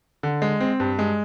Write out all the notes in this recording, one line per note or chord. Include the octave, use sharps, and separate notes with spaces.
D3
G#3
C4
G2
G#3